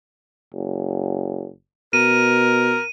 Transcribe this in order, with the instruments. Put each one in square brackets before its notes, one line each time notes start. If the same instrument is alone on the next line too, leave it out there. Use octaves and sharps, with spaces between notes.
[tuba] F#1
[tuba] B2 [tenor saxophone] A#4 [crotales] D#7